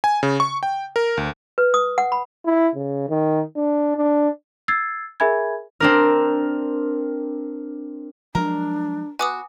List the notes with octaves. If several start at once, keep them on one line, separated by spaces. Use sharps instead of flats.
G#5
C#3
C#6
G5
A#4
D2
B4
D#6
F#5
B5
E4
C#3
D#3
D4
D4
E6 G#6 A6 C7
G#4 A#4 E5 G#5 B5 G#6
C4 D4 A#4
F3 F#3 G#3 D4 A#4
B3 F#4 G#5 D6 D#6